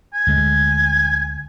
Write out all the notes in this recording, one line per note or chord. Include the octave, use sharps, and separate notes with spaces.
G#5
D2 D3 G#3